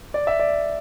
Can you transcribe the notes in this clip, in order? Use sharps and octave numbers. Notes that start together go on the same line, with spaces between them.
D5
E5
D5